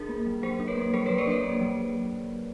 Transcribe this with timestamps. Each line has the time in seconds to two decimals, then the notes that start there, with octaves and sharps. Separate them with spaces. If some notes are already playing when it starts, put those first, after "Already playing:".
Already playing: D4 G#4 A#4
0.09 A#3
0.27 F#3
0.43 F#3 A#4 C5
0.60 D4
0.68 B4 C#5
0.77 A#3
0.94 F#3 A#4 C5
1.06 B4 C#5
1.10 F#3
1.18 C5 D5
1.27 D4 B4 C#5
1.43 A#3
1.61 F#3